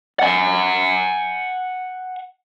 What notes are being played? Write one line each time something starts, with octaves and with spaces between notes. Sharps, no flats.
F#5 G#5